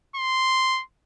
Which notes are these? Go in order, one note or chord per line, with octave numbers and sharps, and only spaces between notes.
C6